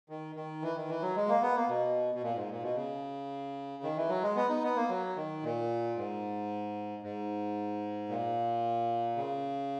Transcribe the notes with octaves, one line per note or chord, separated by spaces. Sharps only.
D#3
D#3
E3
D#3
E3
F#3
G#3
A#3
B3
A#3
B2
B2
A#2
G#2
A#2
B2
C#3
D#3
E3
F#3
G#3
B3
D#4
B3
A#3
F#3
D#3
A#2
G#2
G#2
A#2
C#3